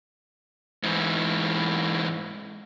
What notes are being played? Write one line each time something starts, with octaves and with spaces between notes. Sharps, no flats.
G#2 E3